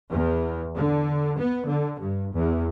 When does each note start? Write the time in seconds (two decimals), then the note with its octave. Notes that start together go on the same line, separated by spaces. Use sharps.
0.10 E2
0.75 D3
1.37 B3
1.67 D3
2.00 G2
2.34 E2